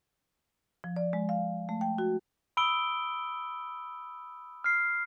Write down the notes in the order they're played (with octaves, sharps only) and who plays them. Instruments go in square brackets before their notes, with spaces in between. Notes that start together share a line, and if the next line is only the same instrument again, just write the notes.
[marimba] F3
D5
G#3
F5
A3
G5
F#4
[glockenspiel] B5 D#6 E6 D7 G7
F6 C7